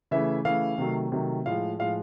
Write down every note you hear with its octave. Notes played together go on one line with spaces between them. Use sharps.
C#3 E3 A3 E5
C#3 E3 A3 F5
C3 D#3 F#3 A3
C3 D#3 F#3 A3
A2 F3 G#3 F5
A2 F3 G#3 F5